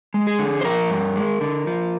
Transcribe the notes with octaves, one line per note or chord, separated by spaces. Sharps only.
G#3
G#4
D3
C5
F3 A#4
G2
G#3
D3
F3